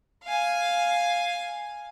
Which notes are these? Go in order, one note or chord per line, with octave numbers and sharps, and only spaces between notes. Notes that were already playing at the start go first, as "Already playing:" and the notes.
F5 G#5